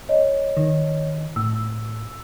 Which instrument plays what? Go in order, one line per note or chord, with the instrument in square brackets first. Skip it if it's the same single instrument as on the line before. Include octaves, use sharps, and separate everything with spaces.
[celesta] C#5 D#5
[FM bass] D#3
[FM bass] A2 [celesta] E6